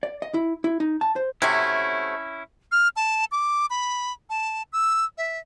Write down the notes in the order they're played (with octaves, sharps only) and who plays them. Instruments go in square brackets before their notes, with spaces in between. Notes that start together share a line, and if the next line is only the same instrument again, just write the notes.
[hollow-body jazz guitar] D5
D#5
E4
E4
D#4
A5
C5
[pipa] C3 F#3 A3 [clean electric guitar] C#4 E4
[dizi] F6
A5
D6
B5
A5
E6
E5